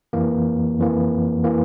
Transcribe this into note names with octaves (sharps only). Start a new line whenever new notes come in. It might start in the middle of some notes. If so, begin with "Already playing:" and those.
F2 E3 A#3
F2 E3 A#3
E3 A#3